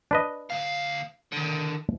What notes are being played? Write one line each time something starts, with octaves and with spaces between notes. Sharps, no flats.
D4 B4 D#5
D2 F5
D3 D#3